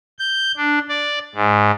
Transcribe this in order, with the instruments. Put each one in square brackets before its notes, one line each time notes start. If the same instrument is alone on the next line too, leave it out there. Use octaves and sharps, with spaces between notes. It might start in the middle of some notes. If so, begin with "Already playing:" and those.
[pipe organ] G6
D4
D5
G#2